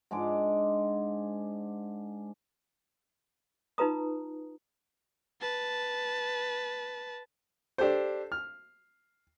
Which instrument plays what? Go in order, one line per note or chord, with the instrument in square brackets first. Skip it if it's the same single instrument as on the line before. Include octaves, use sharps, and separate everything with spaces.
[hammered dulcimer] G#2 G#3 D4 D6
[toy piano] D#4 F4 B4 A#5 D#6
[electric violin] B4 A5
[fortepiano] D4 G4 A4 C5
F6